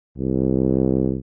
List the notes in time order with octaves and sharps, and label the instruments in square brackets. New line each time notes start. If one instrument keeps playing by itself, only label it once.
[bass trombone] C2